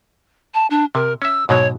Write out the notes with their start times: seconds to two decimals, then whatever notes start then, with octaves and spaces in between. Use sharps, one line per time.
0.54 A5
0.70 D4
0.95 C3 A#4
1.22 C#4 E5 E6
1.49 G#2 B2 F#3 C#5